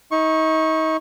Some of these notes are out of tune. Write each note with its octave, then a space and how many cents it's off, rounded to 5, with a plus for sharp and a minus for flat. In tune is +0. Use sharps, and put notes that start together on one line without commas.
D#4 +35 C#6 -15